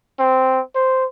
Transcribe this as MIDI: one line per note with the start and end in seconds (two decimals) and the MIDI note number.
0.19 0.60 60
0.75 1.05 72